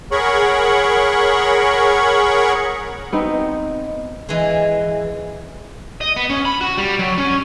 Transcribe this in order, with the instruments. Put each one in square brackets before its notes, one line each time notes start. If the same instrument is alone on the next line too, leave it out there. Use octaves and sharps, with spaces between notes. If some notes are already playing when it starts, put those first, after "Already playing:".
[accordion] G#4 A#4 C#5 F#5 B5 C#6
[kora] B3 C4 D#4
[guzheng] E3 G#3
[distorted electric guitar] D#5
B3
C#4
B5
F#4
G3
F#3
C#4